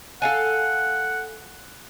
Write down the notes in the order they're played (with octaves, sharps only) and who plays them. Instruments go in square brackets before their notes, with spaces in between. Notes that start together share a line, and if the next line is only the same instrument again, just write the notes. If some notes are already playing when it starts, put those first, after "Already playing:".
[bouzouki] A4 F5 G#5 [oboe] F#5